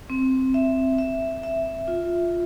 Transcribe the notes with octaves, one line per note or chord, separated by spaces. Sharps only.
C4
E5
E5
E5
F4